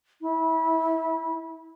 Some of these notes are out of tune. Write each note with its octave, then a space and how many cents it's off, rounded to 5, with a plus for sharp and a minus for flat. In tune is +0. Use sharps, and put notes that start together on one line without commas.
E4 -25